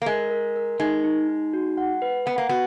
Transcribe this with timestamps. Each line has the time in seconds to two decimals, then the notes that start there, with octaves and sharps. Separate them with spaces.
0.02 A#3
0.06 G#3 A#4
0.31 A#4
0.56 A#4
0.80 G#3 D#4
1.04 D#4
1.28 D#4
1.53 F#4
1.77 F#5
2.02 B4
2.26 B3 F#5
2.38 A#3
2.49 B3 F#4